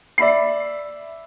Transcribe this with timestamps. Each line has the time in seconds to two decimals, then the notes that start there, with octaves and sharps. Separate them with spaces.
0.18 D5 E5 B5 C7